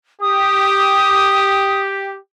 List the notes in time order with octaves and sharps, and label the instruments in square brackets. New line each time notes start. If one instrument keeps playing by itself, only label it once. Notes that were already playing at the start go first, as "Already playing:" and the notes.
[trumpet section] G4 [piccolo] D#6